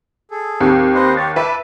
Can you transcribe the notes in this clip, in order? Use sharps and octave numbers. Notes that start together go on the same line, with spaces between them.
G#4 A4
D#2 C4 G4
B4 C5 D#5
G4 C#5 A6
B4 E5 A5 D6